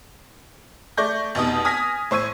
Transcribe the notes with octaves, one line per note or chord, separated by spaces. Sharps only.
A3 D5 C#6 G6 A#6
F1 B2 D#4 D#6
G#5 D#6 F6 G#6 A#6 B6
A2 C5 C#6 E6 G#6 D#7